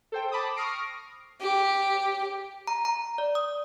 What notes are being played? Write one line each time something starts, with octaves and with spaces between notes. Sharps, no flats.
A4 C5 G5
A5 B5 D6 D#6
C#6 D#6 F6 A#6 C7 D7
G4
A#5
A#5
D5
D#6